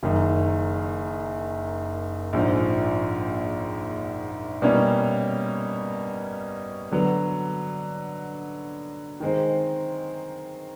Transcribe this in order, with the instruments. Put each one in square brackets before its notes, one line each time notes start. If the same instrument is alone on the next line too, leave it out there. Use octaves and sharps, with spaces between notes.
[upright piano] F#1 F#2 D#3
A#1 G#2 F3
B2 G3 A#3 C#4 E4
D3 F#3 B3
D#3 G#3 C4